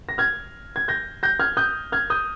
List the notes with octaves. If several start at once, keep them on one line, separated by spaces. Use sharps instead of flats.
A#6
F6 G#6
G#6
G6 A#6
G6 A#6
F6 G#6
D#6 G6
F6 G#6
D#6 G6